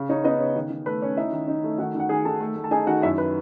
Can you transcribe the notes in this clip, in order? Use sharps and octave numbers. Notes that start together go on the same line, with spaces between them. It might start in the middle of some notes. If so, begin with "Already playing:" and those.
Already playing: C#3
D#4 C#5
B3 D#4 D#5
C#3 C#5
D#3
D#3
A3 B4
C#4 C#5
D#4 E4 E5
D#3
D#4
A3
D#3 F#4 F#5
D#3 F#5
D#3 G#4 G#5
D#3 A4 A5
A3
A3
A5
D#4 G#4 G#5
D#3 F#4 F#5
F#2 E4 E5
B4